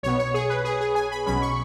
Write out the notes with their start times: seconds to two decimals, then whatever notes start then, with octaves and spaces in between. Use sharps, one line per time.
0.03 B1 B2 B3 C#5
0.19 C#5
0.34 G#4
0.50 B4
0.65 G#4
0.81 G#4
0.95 G#5
1.11 B5
1.26 B1 B2 F#3 C#4 B5
1.42 C#6